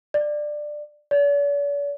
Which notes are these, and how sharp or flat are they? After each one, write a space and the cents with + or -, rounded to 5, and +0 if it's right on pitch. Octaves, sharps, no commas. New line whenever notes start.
D5 +15
D5 -45